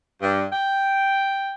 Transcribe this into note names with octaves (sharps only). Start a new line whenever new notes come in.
G2
G5